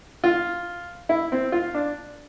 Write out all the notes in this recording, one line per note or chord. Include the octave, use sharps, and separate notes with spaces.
F4
E4
C4
F4
D4